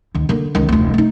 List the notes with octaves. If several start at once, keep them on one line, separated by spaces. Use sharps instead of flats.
D2 D#3
D3 A#3
C#2 D#3
F1 D2
A3 D#4